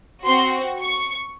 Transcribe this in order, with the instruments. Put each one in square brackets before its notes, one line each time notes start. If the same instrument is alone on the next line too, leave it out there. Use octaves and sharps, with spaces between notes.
[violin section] C4 F#4 C6
C#6